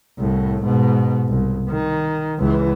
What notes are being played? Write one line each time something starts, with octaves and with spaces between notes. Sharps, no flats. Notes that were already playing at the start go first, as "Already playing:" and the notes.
C2 A2
G#2 B2
C2
D#3
C#2 E3